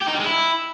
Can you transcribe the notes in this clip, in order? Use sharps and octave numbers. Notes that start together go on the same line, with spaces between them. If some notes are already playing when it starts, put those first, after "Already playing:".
G4
D#4
G3
G#3
E4